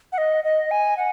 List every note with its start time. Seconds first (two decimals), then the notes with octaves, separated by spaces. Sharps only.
0.12 F#5
0.18 D#5
0.44 D#5
0.71 G#5
0.97 F#5